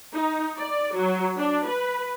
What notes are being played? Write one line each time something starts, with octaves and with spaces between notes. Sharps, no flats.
D#4
D5
F#3
D4
B4